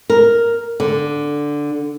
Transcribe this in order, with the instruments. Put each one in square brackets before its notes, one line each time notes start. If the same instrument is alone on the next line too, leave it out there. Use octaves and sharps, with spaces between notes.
[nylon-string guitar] A#4
D3